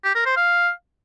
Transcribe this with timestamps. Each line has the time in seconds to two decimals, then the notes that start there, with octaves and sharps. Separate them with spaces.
0.04 G4
0.15 A#4
0.26 C5
0.36 F5